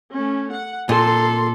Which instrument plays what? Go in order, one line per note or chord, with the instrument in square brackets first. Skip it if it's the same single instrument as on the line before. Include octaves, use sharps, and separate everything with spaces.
[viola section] A3 C#4
F#5
[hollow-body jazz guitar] A#2 [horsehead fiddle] A4 [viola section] C6